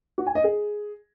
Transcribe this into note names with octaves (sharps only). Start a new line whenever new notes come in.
F#4
G#5
D#5
G#4